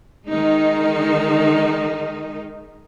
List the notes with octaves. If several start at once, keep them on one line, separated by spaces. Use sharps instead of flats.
D#3 G#3 D#4